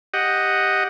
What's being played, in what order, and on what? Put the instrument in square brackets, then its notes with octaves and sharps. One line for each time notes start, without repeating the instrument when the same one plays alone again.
[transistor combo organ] G4 D#5 F#5